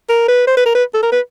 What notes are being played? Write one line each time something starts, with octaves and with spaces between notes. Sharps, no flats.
A#4
B4
C5
B4
A#4
B4
A4
A#4
B4